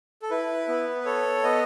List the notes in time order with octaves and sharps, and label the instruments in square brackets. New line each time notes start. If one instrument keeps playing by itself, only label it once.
[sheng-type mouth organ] A4
E4 B4
B3
B4
A4 C#5
B3 D#5